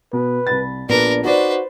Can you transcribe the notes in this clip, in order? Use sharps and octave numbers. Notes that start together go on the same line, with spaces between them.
B2 B4
C2 B5 A6
A#1 B3 D4 A#4 B4 D5
D#4 F#4 B4 C5 D5